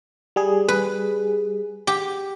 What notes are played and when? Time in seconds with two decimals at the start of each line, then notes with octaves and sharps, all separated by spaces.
0.36 G3 G#4
0.68 B4
1.87 G4